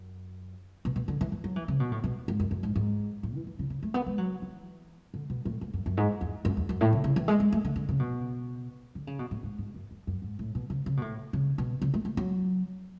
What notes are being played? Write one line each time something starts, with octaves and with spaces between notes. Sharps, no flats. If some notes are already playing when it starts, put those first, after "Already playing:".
Already playing: F#2
B2
B2
D3
E3
E3
F#3
E3
C#3
B2
A2
B2
G#2
F#2
F#2
G#2
G#2
A2
E3
E3
C#3
C#3
A3
B3
G#3
F#3
E3
D3
B2
A2
G#2
F#2
F#2
G#2
E2
F#2
E2
F#2
A2
C#3
C#3
E3
G#3
G#3
A3
D3
D3
C#3
B2
D3
C#3
B2
A2
G#2
G#2
F#2
F#2
F#2
G#2
A2
B2
C#3
C#3
B2
A2
C#3
B2
C#3
A3
A3
F#3